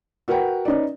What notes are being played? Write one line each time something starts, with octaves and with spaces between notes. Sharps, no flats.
F#4 A#4 B4 F#5 G5
C#4 D#4 B4 D5